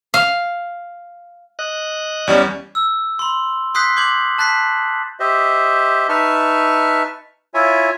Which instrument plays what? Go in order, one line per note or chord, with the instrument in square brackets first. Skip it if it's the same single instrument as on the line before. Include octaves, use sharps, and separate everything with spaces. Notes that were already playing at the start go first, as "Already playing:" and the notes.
[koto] F5
[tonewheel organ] D#5 F#6
[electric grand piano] E2 G3 C#4 [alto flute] D5
[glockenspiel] E6
B5 C6
C6 D#6 F#6 G6 B6 C7
C6 D6 G6 G#6 F#7
A5 F#6 A6 B6 C7
[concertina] G4 C5 D#5 E5
D#4 B4 E5 A5 C#6 F6
E4 F4 C#5 E5 G#5